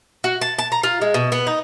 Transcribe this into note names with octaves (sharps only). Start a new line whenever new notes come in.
F#4
A5
A5
A#5
F4
G#3
B2
B3
D#4